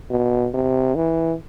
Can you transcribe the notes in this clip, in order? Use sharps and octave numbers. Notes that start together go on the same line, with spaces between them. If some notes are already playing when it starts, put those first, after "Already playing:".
B2
C3
E3